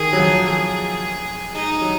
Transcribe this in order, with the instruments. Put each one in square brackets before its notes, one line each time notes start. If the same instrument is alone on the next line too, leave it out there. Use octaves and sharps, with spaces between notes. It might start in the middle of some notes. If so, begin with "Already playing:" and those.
Already playing: [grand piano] D#3 [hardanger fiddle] G#4
[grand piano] F#3
F3
[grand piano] F#3 [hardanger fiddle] G#4
[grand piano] G#3 [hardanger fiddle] D#4
[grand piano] F#3